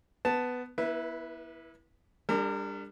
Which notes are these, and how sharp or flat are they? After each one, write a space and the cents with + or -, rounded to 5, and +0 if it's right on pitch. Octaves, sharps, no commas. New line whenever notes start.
B3 +10 A5 +0
B3 -40 E4 -5 B4 +0
G3 +35 D4 +0 A#4 -30